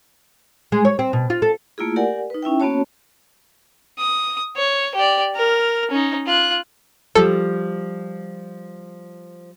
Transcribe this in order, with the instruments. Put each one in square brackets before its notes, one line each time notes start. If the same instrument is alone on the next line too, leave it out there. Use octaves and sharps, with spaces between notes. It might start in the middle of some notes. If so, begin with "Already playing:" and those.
[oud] G#3
C#5
C4
B2
F4
A4
[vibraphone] A3 A#3 E4 F4 G#4
G4 A#4 D5 F#5 G#5
D#4 B4
C#4 E4 E5 G5
A#3 B3 C#4 F#4 C#5 A5
[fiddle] D#6
C#5
G4 D5
A#4 F6
C#4 D#4
F4 F#6
[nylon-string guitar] F3 G3 [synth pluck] A4